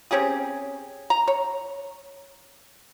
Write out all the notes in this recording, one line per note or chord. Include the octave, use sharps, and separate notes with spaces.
C4 C#4 G4 G#4
A#5
C#5